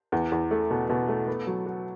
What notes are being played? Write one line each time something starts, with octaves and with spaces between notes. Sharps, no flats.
E2
E2
A3
B2
B2
A3
B3
F#3
F#4